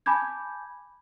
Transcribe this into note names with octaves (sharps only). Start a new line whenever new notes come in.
G#5 A5 B5 D6 G6 G#6